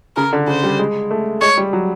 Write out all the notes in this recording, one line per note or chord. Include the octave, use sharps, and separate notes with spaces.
C#3 A#4
D3
C#3 C5
G3
G#3
A3
G#3 C#5
G3
F#3